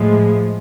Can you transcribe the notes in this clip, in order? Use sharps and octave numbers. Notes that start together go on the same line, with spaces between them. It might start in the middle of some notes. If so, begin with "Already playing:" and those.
Already playing: A2 F3 G#3